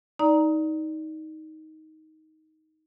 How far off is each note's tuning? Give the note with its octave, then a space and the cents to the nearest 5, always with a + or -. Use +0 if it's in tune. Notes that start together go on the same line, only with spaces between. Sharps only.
D#4 +15 D5 +0 A#5 +0